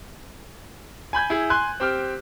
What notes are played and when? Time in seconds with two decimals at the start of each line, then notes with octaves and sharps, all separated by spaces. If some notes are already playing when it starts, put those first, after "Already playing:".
1.13 G#5 B5 G6 G#6
1.30 E4 G#4
1.50 G#5 C6 F#6
1.80 C4 G4 F6